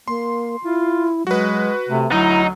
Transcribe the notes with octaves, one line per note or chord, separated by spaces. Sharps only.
A#3 C6
E4 F4
F#3 G#3 F#4 B4
C3 A3
D2 F#3 D#4 E4